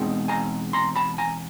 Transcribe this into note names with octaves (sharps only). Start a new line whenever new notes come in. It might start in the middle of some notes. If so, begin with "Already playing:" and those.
Already playing: E2 B2 G#3 C4 D#4
G#5 A#5
A#5 C6
A5 B5
G#5 A#5